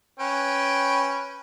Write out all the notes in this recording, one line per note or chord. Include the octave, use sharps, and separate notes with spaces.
C#4 B4 G5